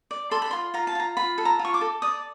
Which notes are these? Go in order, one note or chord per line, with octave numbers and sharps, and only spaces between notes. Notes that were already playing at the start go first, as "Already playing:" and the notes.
D5
A4 C6
B5
F4 C6
F4 A#5
A5
F4 A#5
F4 B5
A4
A#5
F4
C#6
D6
A4
D5 D#6